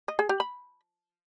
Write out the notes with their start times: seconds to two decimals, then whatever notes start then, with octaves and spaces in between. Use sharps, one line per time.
0.08 D#5
0.19 G#4
0.29 G4
0.40 B5